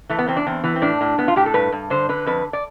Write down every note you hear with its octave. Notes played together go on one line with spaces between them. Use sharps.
E3 A3
B3
E2 C4
D4
E2 C4
E3 B3
C4
A2 D4
A2
A2 B3
F4
A2 G4
A4
G2 B4
G2
D3 C5
D3 B4
F2 B4
D5